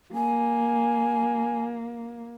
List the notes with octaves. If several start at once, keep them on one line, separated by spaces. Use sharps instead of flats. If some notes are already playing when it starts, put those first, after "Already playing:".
A#3 G#5